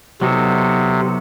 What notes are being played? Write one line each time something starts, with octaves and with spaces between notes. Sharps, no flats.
C3 F#3 B3 D#4 F#4 A4